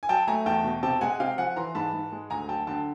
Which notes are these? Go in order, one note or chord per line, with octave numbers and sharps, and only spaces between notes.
G#5
F#3 G5 A5
A3 G#5 A#5
E2 G5 A5
B2
C3 G5 A5
G#3 F#5 G#5
C3 F5 G5
F3 F#5 G#5
E3 A#5 C6
G#2 A5 B5
G#2
G#3
D2 G#5 A#5
F#3 G5 A5
D3 G5 A5